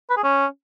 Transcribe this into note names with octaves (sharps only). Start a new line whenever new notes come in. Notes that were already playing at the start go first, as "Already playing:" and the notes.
B4
G#4
C#4